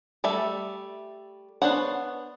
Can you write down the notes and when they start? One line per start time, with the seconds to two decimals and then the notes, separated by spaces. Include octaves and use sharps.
0.24 G3 A3 A4 E5
1.62 B3 D4 C5 C#5 F#5